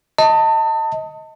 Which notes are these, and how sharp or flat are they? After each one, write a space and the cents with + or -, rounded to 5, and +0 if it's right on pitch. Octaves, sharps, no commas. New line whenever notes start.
D#5 +20 A5 +30